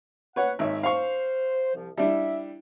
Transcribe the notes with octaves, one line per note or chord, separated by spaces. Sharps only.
B4 C#5 F#5
G#1 C#5 E5
C5 F5 C#6
C2 F3
G3 D4 E4 E5